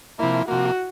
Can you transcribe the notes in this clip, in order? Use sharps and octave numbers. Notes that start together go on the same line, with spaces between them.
C3 F3 A#3 E4
C3 F3 A#3 F#4